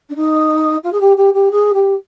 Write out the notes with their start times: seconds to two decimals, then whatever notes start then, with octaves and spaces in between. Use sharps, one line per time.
0.09 D4
0.16 D#4
0.83 F4
0.92 G#4
1.00 G4
1.17 G4
1.34 G4
1.51 G#4
1.74 G4